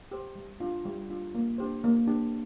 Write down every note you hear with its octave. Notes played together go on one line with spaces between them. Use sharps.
G4 C5
G3
D4 F4
G3
D4 F4
A#3
D4 G4 C5
A#3
D4 G4 C5